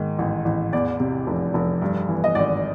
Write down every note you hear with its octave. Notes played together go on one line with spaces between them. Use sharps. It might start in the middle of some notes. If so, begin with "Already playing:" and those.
Already playing: G#2 D#3
A1
A1
E2 D5
C3
F1
F1
G2
E3
D#5
G#1 D5